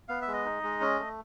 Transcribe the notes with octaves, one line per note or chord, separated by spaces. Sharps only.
B3 F5
E5
G#3
D#5
D#4
G#3
C#4
A3